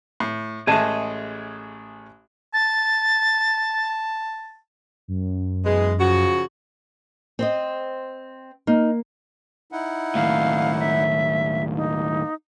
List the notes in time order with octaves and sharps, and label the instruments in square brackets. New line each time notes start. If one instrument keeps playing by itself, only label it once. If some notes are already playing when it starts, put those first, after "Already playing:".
[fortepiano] A2
[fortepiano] A1 G#3 A3 [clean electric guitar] G#4 D#5 A5
[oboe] A5 [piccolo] A6
[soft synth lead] F#2
[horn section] B2 E3 G#3
C#3 F3 F#4
[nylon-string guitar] C4 C5 D#5
[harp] A#3 [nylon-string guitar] D#4
[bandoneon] D#4 E4 F#5
[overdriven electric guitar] D#2 A2 [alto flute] F5
[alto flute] E5
[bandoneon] A#3 [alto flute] D#4